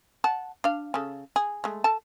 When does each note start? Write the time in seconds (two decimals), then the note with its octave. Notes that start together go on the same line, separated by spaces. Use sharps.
0.24 F#5 A5
0.64 D4 F5
0.94 C#3 A4
1.36 G#4
1.64 G#3 A3
1.84 A4 A5